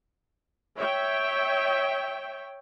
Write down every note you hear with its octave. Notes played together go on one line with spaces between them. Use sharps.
C#5 E5 G5